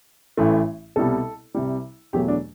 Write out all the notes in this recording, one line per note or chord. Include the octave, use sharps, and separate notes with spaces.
A1 A2 E3 A3
C2 B2 G3 A4
C2 C3 G3
E2 B2 F#3 A3 G4
D4